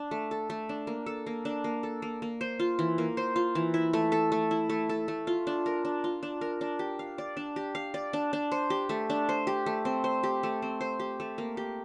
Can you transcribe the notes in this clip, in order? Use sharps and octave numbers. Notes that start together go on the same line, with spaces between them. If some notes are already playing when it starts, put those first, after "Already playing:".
Already playing: D4
A3
A4
A3
D4
A#3
A4
A#3
D4
A#3
A4
A#3
A#3
C5
F4
E3
A#3
C5
F4
E3
E4
A3
A4
A3
E4
A3
A4
A3
F4
D4
A#4
D4
F4
D4
A#4
D4
G4
F5
D5
D4
G4
F5
D5
D4
D4
C5
G4
A3
D4
C5
G4
A3
C4
C5
G4
A3
C4
C5
G4
A3
A#3
G4